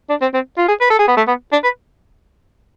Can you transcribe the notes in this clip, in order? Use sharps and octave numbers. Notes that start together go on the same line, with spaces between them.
D4
C4
C4
F4
G#4
B4
A4
G#4
B3
A3
B3
D4
B4